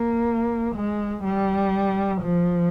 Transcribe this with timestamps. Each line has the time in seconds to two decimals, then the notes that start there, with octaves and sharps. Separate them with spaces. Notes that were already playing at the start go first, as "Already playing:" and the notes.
Already playing: A#3
0.76 G#3
1.24 G3
2.22 F3